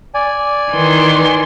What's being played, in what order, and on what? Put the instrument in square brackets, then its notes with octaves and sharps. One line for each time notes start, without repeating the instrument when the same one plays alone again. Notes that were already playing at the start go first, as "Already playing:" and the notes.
[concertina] D5 G#5
[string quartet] D#3 E3 C6